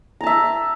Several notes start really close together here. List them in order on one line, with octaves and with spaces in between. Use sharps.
A#5 A5 E5